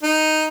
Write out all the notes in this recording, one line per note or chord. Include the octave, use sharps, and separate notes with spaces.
D#4